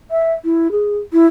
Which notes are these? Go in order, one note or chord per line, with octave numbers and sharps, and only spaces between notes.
E5
E4
G#4
E4